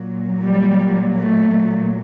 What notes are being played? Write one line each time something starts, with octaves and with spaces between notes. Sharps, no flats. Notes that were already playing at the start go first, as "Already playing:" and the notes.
Already playing: A#2 F#3
G3
A3